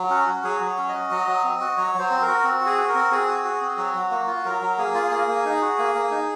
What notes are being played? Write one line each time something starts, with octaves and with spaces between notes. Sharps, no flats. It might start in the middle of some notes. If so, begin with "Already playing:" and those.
Already playing: F#3
C#4 F#4
F#4
F#3 G#4
F#3
C#5
C#4
D#5
F#4
F#3
F#3
C4
F#4
F#3 C#5
F#3 C5
C4
A#4
F#4
C4
F#4
G#4
F#4
A#4
C4
C4 G#4
F#4
F#4
C4
F#3 F#4
F#3
A#3 F#4
F4
F#3 A#4
F#3
A#3 G#4
F4
A#3 G#4
A#3
D#4
F#4
A#3
A#3
D#4